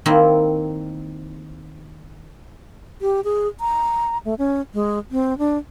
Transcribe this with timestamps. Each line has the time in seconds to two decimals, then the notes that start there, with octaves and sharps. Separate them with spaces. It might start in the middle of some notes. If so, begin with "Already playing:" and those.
0.06 D#3 A#3 C4 E4
3.01 G4
3.24 G#4
3.60 A#5
4.25 A3
4.38 C#4
4.74 G#3
5.11 C4
5.38 D4